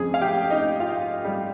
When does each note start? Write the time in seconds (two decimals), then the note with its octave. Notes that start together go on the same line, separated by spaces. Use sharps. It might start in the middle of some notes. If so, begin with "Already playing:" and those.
Already playing: F2 C#3 G#4
0.14 F5
0.22 G4 G5
0.50 D#4 D#5
0.80 F4 F5
1.25 G3 G4